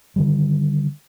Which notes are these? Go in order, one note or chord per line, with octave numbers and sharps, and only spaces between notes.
D3 D#3 G3